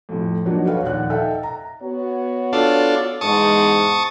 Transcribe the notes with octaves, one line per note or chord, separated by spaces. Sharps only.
F2 A2
F3 F#3 A#3 D4 D#4 F#4
F#4 A4 B4 C#5 F5
A#1 D#2 F#5 F#6
D#4 A4 E5 F5 G5
A#5
B3 F#4 C#5
D4 F4 A4
E2 G#2 G#3 A5 C#6 D#6